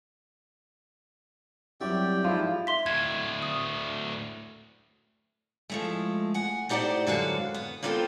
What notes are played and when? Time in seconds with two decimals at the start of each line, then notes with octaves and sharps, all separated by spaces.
1.81 C2 F#2 F#4 G4 D5 E5 G5
2.24 G#2 F3 E4
2.67 E5 C6 B6
2.86 D2 A2 G#6
3.42 D#6
5.70 F3 G#3 A3
6.34 F#5 G#5
6.69 A3 D#4 G4 C5 D5 F#5
7.07 F#2 D3 G#3 F#4 B4 F5
7.54 B3
7.83 A#3 B3 F4 A4 C5 G5